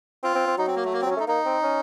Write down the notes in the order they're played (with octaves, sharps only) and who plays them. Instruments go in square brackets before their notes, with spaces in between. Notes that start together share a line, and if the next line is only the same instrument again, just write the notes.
[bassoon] C4 [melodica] F4
[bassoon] C4
C4
[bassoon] F#3 [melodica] D#4
[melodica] C4
A#3
A3
A#3
C4
[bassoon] F#3 [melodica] C#4
[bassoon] A3 [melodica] D#4
[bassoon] A#3 [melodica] D#4
[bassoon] C4
C#4